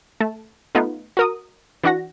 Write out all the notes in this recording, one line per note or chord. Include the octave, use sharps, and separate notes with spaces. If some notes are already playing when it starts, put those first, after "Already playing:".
A3 A5
A3 B3 D#4 F4
F#4 A#4 D#6
E3 D4 F#4 F#5 A#6